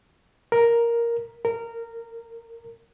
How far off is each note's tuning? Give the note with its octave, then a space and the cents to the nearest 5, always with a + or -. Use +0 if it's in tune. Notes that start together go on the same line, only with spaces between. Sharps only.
A#4 +5
A#4 -15